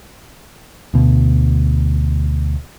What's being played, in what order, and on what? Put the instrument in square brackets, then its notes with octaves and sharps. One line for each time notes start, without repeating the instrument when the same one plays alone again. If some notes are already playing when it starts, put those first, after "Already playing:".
[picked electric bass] D2 B2